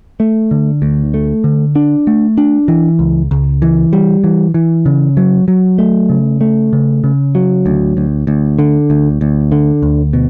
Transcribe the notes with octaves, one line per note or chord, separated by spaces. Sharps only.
A3
D3
D2
A3
D3
D4
A3
D4
E3
C#2
C#2
E3
G3
E3
E3
C#3
F#3
F#3
A3
C#3
A3
C#3
C#3
F#3
D2
D2
D2
D3
D2
D2
D3
D2
B2